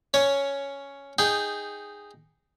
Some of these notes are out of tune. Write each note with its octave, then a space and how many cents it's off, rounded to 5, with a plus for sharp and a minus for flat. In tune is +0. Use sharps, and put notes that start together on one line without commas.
C#4 +5 C#5 +5
D#4 +0 G#4 -10 G5 +0